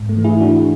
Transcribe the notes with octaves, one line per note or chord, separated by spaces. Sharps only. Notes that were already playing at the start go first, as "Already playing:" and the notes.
Already playing: G#2
A3
E3
E4 G#4
E3 D4 F#4